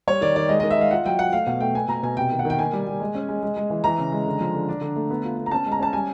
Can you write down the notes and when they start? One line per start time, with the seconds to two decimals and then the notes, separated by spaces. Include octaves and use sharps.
0.07 G3 C#5
0.21 D#3 D5
0.36 D#3 D5
0.49 G#3 D#5
0.60 D#3 D#5
0.70 E5
0.77 G#3 F5
0.91 F4 F#5
1.06 F#3 G5
1.19 F4 F#5
1.33 A3 F5
1.47 B2 F#5
1.60 A3 G5
1.75 B3 G#5
1.88 B2 A#5
2.03 B2 G#5
2.17 C3 G5
2.31 D#3
2.39 F#5
2.45 D#3 G5
2.59 A#3 G#5
2.72 G3
2.87 G3
3.00 G#3
3.15 C#4
3.29 G#3
3.43 G#3
3.57 G#3
3.70 E3
3.84 E3 A#5
3.99 C#3
4.12 G#3
4.26 D3
4.41 F3
4.55 D3
4.69 D4
4.81 D3
4.96 A3
5.10 B3
5.24 F4
5.37 B3
5.46 A#5
5.51 C#4 A5
5.66 G#3
5.72 A#5
5.79 C#4 A5
5.93 G3 G#5